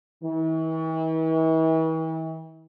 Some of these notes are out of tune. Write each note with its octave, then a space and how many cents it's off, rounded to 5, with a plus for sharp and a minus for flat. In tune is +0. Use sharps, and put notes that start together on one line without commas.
E3 -40